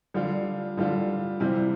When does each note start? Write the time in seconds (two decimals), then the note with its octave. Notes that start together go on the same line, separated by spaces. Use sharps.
0.14 D3 G3 D4 F4
0.77 D3 G3 D4 F4
1.40 C3 E3 G3 C4 F4